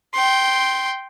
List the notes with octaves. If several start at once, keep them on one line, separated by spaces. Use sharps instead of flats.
G5 C6